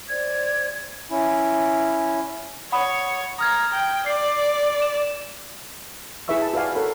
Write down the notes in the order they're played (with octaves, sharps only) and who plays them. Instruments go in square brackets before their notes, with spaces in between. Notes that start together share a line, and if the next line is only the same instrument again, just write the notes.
[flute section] C5 D5 G#6
[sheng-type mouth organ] C#4 E4
[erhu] C#5 [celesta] F#5 B5 D#6
[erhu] A#5 [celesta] D#6 F6 G#6
[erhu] G5
[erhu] D5 [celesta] C7
[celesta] E7
[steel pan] E4 G#4 B4 E5 C#6 E6
A5
F#4 B4 D5 F5 G#5
A4 A#4 C#5 F#5 B5